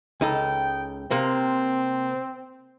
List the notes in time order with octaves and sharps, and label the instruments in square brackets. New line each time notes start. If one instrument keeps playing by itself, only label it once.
[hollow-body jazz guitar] C#2 D#4 A4 [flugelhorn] G5
[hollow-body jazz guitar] C3 A#3 [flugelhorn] C4